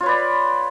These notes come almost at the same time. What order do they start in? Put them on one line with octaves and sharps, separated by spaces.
F4 C#5 B4 D5